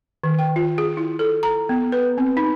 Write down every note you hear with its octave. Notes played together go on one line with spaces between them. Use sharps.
D#3
G5
F4
G#4
E4
A4
A#5
B3
B4
C4
D#4